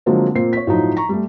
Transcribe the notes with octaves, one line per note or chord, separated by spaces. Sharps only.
D3 F3 F#3 G#3 A#3 C4
A#2 A#3 C4 C7
C#5 B6
A2 F3 F#3 D#4
A#5 C#6
G3 A3